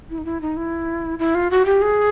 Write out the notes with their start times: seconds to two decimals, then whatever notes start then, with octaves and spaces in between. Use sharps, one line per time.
0.10 E4
0.18 D#4
0.25 E4
0.41 D#4
0.57 E4
1.19 E4
1.35 F4
1.51 F#4
1.65 G4
1.82 G#4